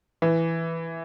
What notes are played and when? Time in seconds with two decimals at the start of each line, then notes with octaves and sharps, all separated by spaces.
0.22 E3